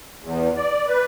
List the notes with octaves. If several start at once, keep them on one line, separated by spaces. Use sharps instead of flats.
E2
D5
B4